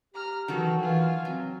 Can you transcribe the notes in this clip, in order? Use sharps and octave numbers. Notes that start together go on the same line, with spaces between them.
G4 A#5 F6
D#3 E3 F#3 F#4 A4
E3 F4 G#5
F#3 C4